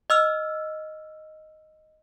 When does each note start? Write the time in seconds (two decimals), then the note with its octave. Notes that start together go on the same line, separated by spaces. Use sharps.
0.10 D#5 E6 F6